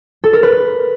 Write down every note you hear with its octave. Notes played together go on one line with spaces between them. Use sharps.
A4
A#4
B4